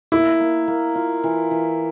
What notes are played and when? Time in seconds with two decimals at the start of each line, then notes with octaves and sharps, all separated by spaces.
0.12 A#3 E4
0.40 A#3
0.68 A#3
0.95 F4
1.24 E3
1.51 E3